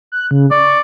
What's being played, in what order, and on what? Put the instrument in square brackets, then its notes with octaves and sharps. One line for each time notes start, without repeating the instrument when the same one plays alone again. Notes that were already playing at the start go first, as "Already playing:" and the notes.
[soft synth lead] F#6
C#3
[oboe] D5 [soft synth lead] C#6